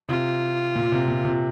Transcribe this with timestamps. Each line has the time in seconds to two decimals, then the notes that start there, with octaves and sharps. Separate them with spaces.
0.09 C3 F4
0.76 A#2
0.92 C3
1.08 A#2
1.25 C3